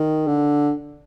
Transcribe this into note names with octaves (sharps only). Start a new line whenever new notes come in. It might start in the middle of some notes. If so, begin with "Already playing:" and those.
Already playing: D#3
D3